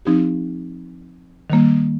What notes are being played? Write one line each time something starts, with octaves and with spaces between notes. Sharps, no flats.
F3 C4 D#4 G4
D#3 G3 A#3